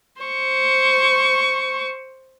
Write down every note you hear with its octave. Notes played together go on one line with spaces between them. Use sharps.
C5 C#6